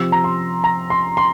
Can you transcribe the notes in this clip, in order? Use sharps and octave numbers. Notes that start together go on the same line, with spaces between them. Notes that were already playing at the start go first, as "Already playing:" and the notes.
Already playing: C3 F3 C4 E6
A#5
C6
A#5
C6
C6